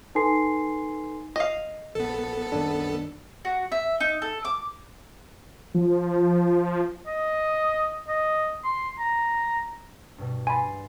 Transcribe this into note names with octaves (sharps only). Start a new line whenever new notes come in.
D#4 A4 B4 G#5 C6 C7
D#5 F5
A#1 B3 A4
C2 F#2 D#3 D4
F#4
E5
D#4
A4
D6
F3
D#5
D#5
C6
A#5
G2 B2
G#5 B5 C6 A6